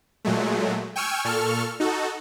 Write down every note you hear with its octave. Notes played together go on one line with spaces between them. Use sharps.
A#2 F#3 G#3 A3
G5 G#5 C#6 E6 F6 G#6
A#2 A4 C#6 F6
D#4 F#4 A4